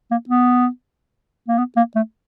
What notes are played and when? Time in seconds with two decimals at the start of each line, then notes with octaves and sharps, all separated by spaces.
0.11 A#3
0.29 B3
1.48 A#3
1.58 B3
1.77 A#3
1.96 A3